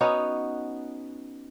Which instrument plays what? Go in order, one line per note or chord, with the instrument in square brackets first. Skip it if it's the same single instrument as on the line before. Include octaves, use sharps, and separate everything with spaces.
[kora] B3 C#4 D#4 F#4